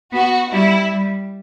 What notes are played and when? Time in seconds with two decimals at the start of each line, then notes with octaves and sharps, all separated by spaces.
0.13 B3 F#4
0.51 G3 E4
0.92 G3